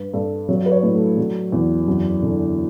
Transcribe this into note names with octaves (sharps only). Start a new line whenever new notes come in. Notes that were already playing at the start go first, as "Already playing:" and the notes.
Already playing: G2 B4
G2 A4
F#3 C#5
B4
C#5
A2
A4
F#3
E2
F#2
D3